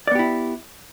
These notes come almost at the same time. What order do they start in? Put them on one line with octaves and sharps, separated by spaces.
D5 B3 G4 E4